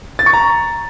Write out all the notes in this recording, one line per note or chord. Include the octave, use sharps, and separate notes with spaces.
A6
C#6
A#5